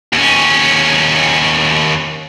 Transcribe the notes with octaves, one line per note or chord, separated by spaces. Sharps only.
D#2 C#4